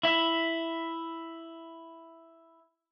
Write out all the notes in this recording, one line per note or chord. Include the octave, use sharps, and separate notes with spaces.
E4 E5